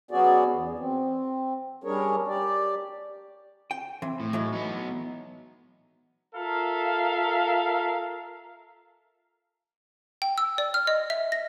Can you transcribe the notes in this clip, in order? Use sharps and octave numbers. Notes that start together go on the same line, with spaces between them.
F#3 B3 C#4 F#4 G#4 D5
E2
C4
G3 C#4 D4 G#4 A#4 C#5
G4 D5
G5
E3 C4
A2
E3 F#3 G#3
B3 D#4
F4 A4 A#4 E5 F5
G5
E6
D5
F6
D#5
E5
A#6